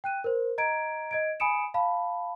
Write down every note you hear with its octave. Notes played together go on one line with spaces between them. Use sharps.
G5 F#6 D#7
A#4 C5
D#5 A#5 G#6 D7
D#5 G#6 D7
G#5 B5 D#6 C#7 D7 E7
F5 A5 B5